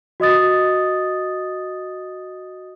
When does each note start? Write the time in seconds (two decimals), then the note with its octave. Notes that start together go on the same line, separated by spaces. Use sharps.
0.20 F#4 D#5 D#6 A6